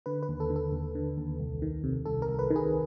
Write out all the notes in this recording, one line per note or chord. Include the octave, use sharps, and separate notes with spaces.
D3 B4
B4
D#2
A4
D3
A4
D#2
D3
D#2
C2
D#3
C3
C2 A4
A#4
C2
B4
D#3
G#4